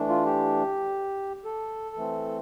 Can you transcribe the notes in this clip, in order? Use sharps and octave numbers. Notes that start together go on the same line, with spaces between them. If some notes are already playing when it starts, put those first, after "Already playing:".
Already playing: E3 A3 D4
F4
G4
A4
E3 A3 C4